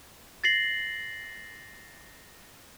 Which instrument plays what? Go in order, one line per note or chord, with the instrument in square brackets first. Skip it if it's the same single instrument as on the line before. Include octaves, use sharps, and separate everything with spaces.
[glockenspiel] A6 A#6 C7 F#7